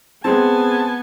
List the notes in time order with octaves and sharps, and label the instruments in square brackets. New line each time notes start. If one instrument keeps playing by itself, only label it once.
[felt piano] G#3 C4 [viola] B3 G#5 [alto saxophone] A5